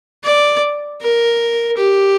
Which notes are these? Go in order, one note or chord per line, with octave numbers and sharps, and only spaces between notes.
D5
A#4
G4